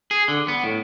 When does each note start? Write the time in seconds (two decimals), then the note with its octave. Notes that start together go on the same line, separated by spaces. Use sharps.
0.11 G#4
0.28 D3
0.48 B3
0.63 A2